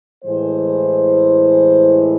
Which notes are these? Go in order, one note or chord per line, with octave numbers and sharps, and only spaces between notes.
A2 E3 G#3 C5